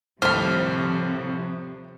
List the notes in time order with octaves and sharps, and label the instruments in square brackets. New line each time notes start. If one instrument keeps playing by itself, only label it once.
[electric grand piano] D#2 A2 G3 [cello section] C3 F3 [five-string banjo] C5 B5 [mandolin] F6